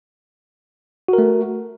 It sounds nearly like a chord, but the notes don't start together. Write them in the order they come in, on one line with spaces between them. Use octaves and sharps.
F#4 A#4 A3